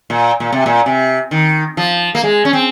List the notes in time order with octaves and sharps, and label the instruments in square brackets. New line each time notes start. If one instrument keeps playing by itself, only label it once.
[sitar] A#2
A#2
C3
A#2
C3
D#3
F3
A#3
G#3
C#4
C4